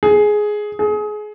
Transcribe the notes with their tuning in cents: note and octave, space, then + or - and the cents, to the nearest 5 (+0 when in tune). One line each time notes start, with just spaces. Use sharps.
G#4 +10
G#4 +25